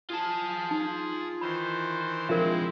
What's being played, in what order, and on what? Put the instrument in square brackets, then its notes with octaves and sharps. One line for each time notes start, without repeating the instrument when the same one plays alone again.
[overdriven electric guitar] F4 A5 [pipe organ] G#4
[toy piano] D#4
[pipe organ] D#3 E3 C5 [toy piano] B5
[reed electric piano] F3 D4 F4 [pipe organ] G#3 C4 E4 [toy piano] A#4 E5